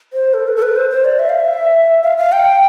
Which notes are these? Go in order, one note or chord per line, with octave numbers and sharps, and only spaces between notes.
C5
A4
B4
A4
B4
C5
C5
D5
E5
F5
E5
F5
F5
G5